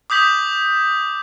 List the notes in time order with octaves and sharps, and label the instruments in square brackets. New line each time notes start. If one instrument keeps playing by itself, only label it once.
[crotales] D6 D#6 G6 B6 F#7